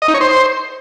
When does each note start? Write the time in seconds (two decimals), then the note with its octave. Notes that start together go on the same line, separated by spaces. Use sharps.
0.02 D#5
0.08 D#4
0.14 C#5
0.21 C5